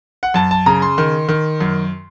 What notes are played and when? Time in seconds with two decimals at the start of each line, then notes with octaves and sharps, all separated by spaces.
0.23 F#5
0.34 F#2 A5
0.51 A5
0.66 C#3 A#5
0.82 C6
0.98 D#3
1.29 D#3
1.61 F#2